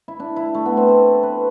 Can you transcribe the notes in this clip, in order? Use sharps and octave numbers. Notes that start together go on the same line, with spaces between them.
E4
D4
E4
A3
B3
C4
A4
B4